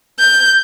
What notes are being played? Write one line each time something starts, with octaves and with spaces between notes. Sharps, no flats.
G6